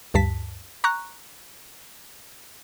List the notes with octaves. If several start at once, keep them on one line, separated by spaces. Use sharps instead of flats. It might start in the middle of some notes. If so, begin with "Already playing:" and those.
D2 G2 A5 B6
A#5 C#6 F#6